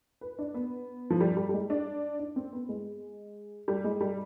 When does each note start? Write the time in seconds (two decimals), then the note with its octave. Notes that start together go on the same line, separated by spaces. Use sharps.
0.21 B4
0.39 D4
0.54 B3
1.10 F3
1.20 G3
1.37 G3
1.49 G3
1.53 G#3
1.70 D4
2.19 D4
2.36 C4
2.53 B3
2.69 G#3
3.68 G3
3.84 G#3
4.01 G3